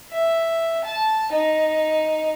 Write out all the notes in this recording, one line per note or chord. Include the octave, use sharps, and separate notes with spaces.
E5
A5
D#4